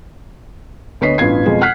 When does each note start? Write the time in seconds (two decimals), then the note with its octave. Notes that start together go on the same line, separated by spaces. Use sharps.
1.01 D2 B3 C#5 D#5 B6 C7
1.18 A1 G2 B3 F4 G#6 C7
1.46 F2 B2 G#3 F4
1.61 F#5 F6 F#6 B6 C7